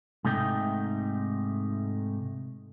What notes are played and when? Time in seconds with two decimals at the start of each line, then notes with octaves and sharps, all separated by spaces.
0.25 G#2 C3 A3 D#4 D#5 G5